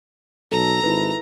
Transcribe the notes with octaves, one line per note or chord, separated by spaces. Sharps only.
B1 A4 A#5
G#1 E4 B4